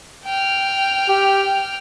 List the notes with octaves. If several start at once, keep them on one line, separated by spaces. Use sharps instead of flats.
G5 F6
G4